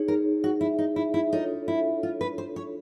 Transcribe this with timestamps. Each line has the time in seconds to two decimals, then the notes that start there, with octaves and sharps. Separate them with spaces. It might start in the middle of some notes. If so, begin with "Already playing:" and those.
Already playing: D#4 G#4 C#5
0.08 A#4
0.44 F#4
0.61 E4
0.79 D#4
0.96 E4
1.14 E4
1.32 D4 D#4 F4 A4 C#5
1.68 E4
2.03 F4
2.21 B4
2.38 C5
2.56 C#5